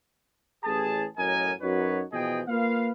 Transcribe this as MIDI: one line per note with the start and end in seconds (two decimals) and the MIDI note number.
0.64 1.05 33
0.64 1.05 68
0.64 1.05 81
1.18 1.52 42
1.18 1.52 45
1.18 1.52 54
1.18 1.52 70
1.18 1.52 75
1.18 1.52 80
1.61 2.02 42
1.61 2.02 63
1.61 2.02 66
1.61 2.02 71
1.61 2.02 73
2.12 2.41 47
2.12 2.41 52
2.12 2.41 53
2.12 2.41 68
2.12 2.41 75
2.12 2.41 79
2.47 2.91 58
2.47 2.91 65
2.47 2.91 71
2.47 2.91 77